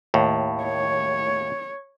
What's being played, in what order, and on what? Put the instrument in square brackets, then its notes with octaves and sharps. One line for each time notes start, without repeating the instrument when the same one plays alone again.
[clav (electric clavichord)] D#2 A2
[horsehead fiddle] C#5